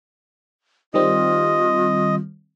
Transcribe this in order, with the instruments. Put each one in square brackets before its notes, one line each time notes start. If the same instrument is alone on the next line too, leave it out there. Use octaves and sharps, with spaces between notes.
[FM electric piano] D#3 G3 C4 [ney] F4 [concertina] D#5